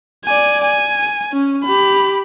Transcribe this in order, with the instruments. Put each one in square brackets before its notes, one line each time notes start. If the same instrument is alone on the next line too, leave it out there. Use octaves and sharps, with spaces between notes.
[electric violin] D5 G#5
G#5
C#4
G4 B5